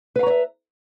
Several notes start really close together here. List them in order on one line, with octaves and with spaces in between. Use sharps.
B4 F5 A#5 C#5 E5